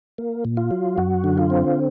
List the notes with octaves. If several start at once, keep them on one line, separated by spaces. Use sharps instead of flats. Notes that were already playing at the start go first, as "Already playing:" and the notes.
A#3
A#2
F4
F#3
F#2 F#4
D3
F4
C4